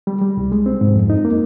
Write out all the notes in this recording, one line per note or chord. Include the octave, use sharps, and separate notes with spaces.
G3
G3
C2
G#3
C4
G#2
F2
D#4
A#3